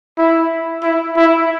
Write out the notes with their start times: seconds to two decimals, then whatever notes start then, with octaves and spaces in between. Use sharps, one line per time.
0.18 E4
0.84 E4
1.17 E4